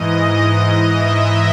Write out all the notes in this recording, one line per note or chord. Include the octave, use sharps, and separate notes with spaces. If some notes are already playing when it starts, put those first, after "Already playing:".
Already playing: G#2 E3 D#5
E5